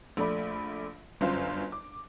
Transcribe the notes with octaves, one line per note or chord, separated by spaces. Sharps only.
A#1 A3 D5 B5
G1 F#2 F4 C5
D6